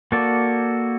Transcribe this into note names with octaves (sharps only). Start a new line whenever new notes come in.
A#3 F#4 A4 D5